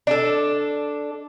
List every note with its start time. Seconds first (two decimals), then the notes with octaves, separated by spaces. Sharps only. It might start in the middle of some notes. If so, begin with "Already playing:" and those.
0.07 D4 A4